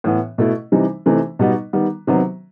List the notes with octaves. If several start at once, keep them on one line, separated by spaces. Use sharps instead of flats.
A2 E3 B3
B2 A3 E4
C3 E3 G3 D#4
C3 E3 A3 D#4
B2 G3 B3 D#4
D#3 G3 B3
C3 D#3 F#3 B3